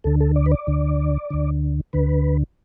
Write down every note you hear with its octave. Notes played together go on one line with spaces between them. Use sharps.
D2 D3 A4
A4
D5
B4
D5
D2 D3
D2 D3
D2 D3 B4